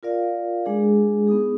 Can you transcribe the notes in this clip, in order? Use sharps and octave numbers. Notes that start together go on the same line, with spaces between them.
F4 A#4 D5 F5
G#3 D4 G#4
B3 D#4 G#4